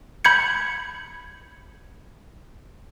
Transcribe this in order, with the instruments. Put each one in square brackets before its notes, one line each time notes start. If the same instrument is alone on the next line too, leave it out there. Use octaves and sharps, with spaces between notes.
[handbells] B5 G6 G#6 C#7